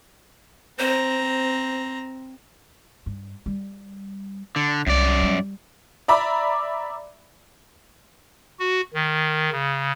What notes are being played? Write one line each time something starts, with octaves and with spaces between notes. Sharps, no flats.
C4 C5 A#5
G2
G3
D3
C2 F#2 D5
G3
D5 E5 A#5 B5 D6
F#4
D#3
C#3